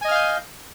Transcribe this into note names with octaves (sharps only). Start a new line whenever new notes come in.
D#5 F5 G#5 F6 G6